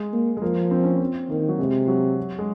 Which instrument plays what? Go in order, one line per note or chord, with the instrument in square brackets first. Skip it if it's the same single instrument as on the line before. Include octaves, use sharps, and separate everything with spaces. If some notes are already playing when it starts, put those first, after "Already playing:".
Already playing: [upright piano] G#3
[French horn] A#3
[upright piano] G#3
[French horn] F3 [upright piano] A#3
[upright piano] C4
C#4
C4
[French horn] D#3 [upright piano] A#3
[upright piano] F#3
[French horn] C3 [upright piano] G#3
[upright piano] F#3
G#3